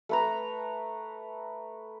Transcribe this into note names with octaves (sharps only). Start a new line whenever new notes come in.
A3 B4 A#5